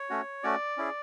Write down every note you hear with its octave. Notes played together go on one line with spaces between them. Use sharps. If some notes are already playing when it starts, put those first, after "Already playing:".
Already playing: C#5
A3 C#4 F#4
A3 C#4 F#4 D5
C#4 E4 G#4